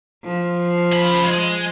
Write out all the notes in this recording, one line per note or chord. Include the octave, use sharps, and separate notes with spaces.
F3
C#3 B5
G#3